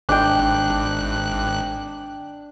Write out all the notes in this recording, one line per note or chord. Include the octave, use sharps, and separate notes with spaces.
G#1 D4 G5 F#6